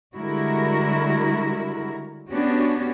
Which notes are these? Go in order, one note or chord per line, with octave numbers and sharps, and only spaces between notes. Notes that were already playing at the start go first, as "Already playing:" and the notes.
D3 G3 G#3 E4 F#4 A#4
B3 C#4 D4 F#4 G4